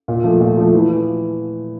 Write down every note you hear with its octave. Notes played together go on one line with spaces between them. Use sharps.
A#2
F3 A3
A#2
F3 A3
E3